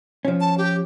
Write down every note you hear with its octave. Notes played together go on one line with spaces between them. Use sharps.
F3 C#4
A5
G4